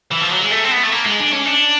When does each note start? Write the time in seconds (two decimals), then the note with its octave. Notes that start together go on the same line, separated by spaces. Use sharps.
0.11 E3
0.21 F3
0.31 F#3
0.41 G#3
0.51 A3
0.64 C4
0.71 B3
0.83 A3
0.92 A#3
1.06 G#3
1.19 D4
1.33 C#4
1.46 D4